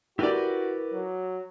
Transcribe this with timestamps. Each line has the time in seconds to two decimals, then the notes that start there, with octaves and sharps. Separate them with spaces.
0.19 E4 F#4 G4 A#4 B4 D5
0.93 F#3